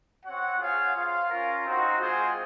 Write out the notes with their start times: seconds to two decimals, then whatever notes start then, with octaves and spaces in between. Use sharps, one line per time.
0.25 C4 F#4 C#5 F#5
0.59 F4 G#4 C#5 F5
0.95 F4 C5 F5
1.30 C#4 F4 A#4
1.66 C4 D#4 F#4 C5
2.00 G#3 C4 F4 G#4 C5